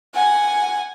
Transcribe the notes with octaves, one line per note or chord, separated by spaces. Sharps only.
F#5 G#5